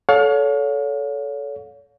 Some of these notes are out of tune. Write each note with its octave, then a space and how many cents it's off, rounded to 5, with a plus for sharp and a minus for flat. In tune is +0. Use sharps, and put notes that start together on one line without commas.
A4 -15 C#5 +30 F5 +35